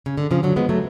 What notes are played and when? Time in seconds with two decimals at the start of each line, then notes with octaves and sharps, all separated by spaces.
0.06 C#3
0.18 D3
0.31 C#3 F3
0.43 D3 F#3
0.56 G#3 B3
0.69 F#3 A3